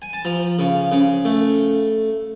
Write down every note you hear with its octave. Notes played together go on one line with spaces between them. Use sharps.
G#5
A5
F3 A#5
C#3
C#3
A3